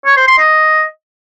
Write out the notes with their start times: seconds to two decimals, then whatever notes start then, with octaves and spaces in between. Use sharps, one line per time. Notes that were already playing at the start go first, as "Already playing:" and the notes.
0.06 C#5
0.17 C5
0.28 C6
0.39 D#5